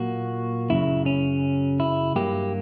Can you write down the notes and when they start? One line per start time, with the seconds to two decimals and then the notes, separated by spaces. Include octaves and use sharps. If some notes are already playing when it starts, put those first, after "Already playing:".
Already playing: A#2 F#3 A#3 F#4
0.70 F#2 C#3 F#3 E4
1.06 C#4
1.80 E4
2.16 G2 F#3 A#3 G4